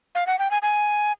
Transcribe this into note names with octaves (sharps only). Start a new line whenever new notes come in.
F5
F#5
G5
G#5
G#5